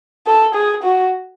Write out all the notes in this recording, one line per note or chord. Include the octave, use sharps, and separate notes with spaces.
A4
G#4
F#4